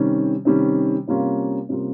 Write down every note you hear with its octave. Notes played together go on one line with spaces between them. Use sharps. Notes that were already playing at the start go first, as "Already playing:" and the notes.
Already playing: C3 D#3 G3 C#4
C3 D#3 G3 C#4
C3 G3 A#3 C#4 F4
C3 G3 A#3 C#4 F4